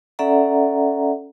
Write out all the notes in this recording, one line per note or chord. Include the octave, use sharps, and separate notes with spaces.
C#4 A4 D5 E5 F#5 A#5